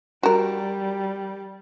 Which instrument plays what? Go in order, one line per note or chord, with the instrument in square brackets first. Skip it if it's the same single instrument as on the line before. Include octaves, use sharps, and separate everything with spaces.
[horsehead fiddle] G3 [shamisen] F#4 A#4